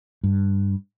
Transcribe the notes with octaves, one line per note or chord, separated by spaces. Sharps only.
G2